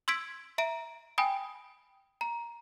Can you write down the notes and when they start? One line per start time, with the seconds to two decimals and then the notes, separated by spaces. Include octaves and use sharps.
0.08 C6 E6 G#6 B6 D7
0.58 E5 A#5 D7
1.18 G5 G#5 B5 D#6
2.21 A#5